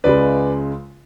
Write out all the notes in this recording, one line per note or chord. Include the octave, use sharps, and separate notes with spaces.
C#2 C#3 G#3 B4 D5